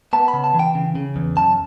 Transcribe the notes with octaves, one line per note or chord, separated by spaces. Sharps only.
B3 A5
B5
C#3
A5
E3
G5
C#3
C#3
E2
F#2 A5